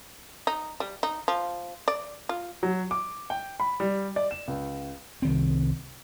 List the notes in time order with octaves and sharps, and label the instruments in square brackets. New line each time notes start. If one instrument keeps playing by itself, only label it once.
[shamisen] D#4
G3
D#4
F3
D5
F4
[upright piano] F#3
D6
G5
B5
G3
D5
E7
C#2
[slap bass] C2 D#3 C4